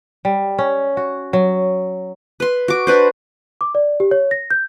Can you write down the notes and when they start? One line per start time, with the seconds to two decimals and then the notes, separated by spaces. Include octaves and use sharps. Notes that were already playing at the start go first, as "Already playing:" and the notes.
0.25 G3
0.58 C#4
0.97 F#4
1.33 F#3
2.40 B4 C6
2.68 F#4 D6
2.87 D4 B4 C5
3.61 D6
3.75 D5
4.00 G4
4.11 C#5
4.31 A#6
4.50 G6